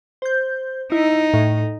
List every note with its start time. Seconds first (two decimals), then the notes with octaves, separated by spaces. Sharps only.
0.22 C5 G6
0.92 D#4 E4
1.34 A2